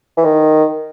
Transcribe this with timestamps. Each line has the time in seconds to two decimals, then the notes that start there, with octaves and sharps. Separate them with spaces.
0.17 E3
0.25 D#3